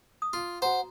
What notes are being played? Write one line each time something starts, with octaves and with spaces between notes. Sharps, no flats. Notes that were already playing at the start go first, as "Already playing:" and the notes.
D#6
F4
F#4 C5 F#5 A#5